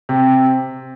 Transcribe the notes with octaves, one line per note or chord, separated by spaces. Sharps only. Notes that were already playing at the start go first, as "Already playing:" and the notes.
C3